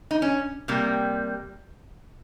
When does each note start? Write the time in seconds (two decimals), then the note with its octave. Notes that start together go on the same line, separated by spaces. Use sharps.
0.11 D#4
0.22 C#4
0.68 C3 G3 A#3